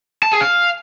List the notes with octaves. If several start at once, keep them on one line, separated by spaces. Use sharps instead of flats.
A5
G#4
F5